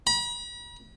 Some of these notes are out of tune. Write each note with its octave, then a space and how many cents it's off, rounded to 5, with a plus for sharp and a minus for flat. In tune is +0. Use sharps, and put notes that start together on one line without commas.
B5 -45